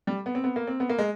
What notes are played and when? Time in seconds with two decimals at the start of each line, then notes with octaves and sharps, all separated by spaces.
0.07 G3
0.26 B3
0.35 C4
0.44 B3
0.56 A#3
0.67 C4
0.80 B3
0.89 A#3
0.98 G#3